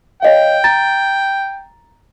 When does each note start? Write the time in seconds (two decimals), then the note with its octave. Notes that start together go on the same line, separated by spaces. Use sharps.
0.22 C#5 D#5 F5 G5
0.64 A#5 A6